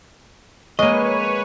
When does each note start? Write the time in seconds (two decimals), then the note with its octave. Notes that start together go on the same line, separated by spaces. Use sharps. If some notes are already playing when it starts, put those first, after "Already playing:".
0.79 G#3 A#3 B4 C#5 D#5 C#6 D#7